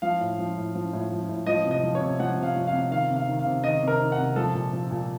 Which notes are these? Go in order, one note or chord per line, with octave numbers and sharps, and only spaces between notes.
F3 F5
A2
F3
A2
F3
A2
F3
A2
F3 D#5
C3
D#5
F3
C#5
C3
F3 F#5
C3 F5
F3
F5
C3
D#3 F5
C3
F5
D#3
F5
C3
D#3 D#5
C3
A#4
D#3
F#5
C3
F3 A4
A#2
F3
A#2